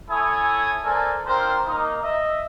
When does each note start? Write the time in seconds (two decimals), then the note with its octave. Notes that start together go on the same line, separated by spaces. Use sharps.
0.10 E4 A4 C#5 G#5 D#6
0.85 A4 A#4 C5 D5 G#5
1.26 C4 D4 F4 A#4 C5
1.66 A#3 D#4
2.02 D#5 E5